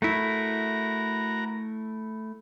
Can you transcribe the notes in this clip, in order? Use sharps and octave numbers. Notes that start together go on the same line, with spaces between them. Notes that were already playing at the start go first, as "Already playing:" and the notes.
A3 E4 F#4 A#4 A#5